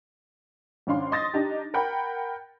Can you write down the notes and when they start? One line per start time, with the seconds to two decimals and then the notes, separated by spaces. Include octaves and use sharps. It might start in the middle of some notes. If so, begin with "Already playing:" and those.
0.87 G#1 C#4 D4 F5 C6
1.12 D#5 C6 D#6 A6 A#6
1.34 D4 D#4 G4
1.74 A#4 F#5 G5 B5